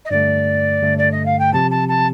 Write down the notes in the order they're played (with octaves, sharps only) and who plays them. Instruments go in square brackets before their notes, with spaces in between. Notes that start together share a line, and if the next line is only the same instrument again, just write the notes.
[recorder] D#5
[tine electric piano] G2 D3 A3 [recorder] D5
[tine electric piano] G2 D3 A3
[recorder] D5
D#5
F5
G5
[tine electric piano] C3 F3 C4 G4 [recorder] A5
[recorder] A5
A5